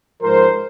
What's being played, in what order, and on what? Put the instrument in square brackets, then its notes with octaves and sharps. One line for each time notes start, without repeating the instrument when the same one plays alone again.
[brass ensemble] G#2 F3 G#3 A#4 C5